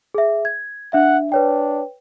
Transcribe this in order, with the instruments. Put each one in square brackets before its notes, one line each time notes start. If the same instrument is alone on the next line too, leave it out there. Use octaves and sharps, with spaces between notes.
[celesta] G#4 E5
G#6
[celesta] D4 E5 [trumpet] F#5
[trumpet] D4 [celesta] B4 C#5 G5